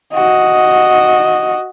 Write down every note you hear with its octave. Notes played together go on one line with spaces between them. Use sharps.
F#4 D#5